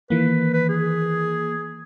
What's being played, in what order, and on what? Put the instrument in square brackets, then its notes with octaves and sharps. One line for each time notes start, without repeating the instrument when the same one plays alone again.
[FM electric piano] D#3 E3 A#3 [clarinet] B4
[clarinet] B4
G#4